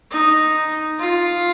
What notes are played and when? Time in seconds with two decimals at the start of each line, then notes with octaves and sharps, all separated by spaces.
0.11 D#4
1.00 F4